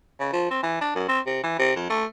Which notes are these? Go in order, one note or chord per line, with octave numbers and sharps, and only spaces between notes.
C#3
F3
C4
E3
D4
F#2
C4
C3
E3
C3
F2
A3